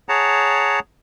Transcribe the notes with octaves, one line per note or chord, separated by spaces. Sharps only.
G#4 C#5 F#5 A5 A#5